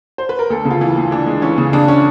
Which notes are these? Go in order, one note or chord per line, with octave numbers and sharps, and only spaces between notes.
C5
B4
A#4
D2 A4
C#3
F4
E3
D2
E3 D4
G#3
E3 C#4
C#3
C#3 D4
C#4